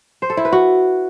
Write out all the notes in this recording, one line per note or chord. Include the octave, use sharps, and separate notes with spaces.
C5
A4
E4
B4
F#4